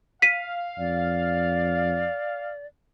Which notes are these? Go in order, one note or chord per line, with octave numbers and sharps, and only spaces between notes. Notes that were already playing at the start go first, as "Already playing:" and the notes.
F5 B6 D#7
F2 D5